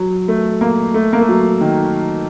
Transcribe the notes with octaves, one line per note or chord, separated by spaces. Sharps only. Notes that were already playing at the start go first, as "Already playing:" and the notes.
Already playing: F#3
A3
A#3
A3
A#3
A3
F#3
D#3